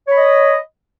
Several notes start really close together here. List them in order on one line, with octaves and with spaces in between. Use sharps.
C#5 B5 D#5